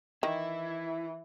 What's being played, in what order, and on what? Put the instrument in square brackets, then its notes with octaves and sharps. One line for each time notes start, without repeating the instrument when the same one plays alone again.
[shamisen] D#3 [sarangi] E3 [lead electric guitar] E4